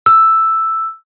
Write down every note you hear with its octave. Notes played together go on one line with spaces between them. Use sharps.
E6